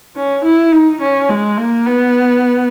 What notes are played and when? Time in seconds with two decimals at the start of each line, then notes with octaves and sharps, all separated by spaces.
0.16 C#4
0.44 E4
0.72 D#4
1.01 C#4
1.29 G#3
1.58 A#3
1.86 B3